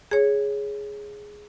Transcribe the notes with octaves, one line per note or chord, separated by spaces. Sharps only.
G#4 C#5